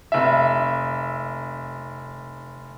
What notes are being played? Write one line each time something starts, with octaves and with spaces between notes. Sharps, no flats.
F1 E5